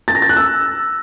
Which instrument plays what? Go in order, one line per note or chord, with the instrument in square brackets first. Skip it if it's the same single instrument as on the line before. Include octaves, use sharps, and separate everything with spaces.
[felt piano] A6
A#6
A6
F#6
E6